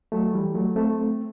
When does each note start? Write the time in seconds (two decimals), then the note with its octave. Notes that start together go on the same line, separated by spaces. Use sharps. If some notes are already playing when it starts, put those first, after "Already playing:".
0.12 F#3 A3
0.33 E3 G3
0.54 F#3 A3
0.76 A3 C4